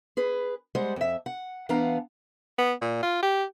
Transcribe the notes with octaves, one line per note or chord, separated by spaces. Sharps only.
G#4 B4
G3 G#3 C5 F#5
F2 E5
F#5
E3 B3 D4 F5 F#5 A#5
B3
A#2
F4
G4